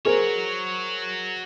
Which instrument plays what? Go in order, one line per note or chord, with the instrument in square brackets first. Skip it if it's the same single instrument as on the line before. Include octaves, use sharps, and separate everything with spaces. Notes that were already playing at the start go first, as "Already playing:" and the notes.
[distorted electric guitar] F#4 C#5 [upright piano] G#4 A#4 C5